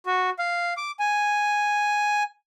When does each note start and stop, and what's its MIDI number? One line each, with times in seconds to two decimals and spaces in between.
0.06 0.30 66
0.39 0.73 77
0.77 0.91 86
1.00 2.23 80